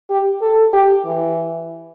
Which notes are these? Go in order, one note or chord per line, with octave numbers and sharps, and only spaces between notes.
G4
A4
G4
E3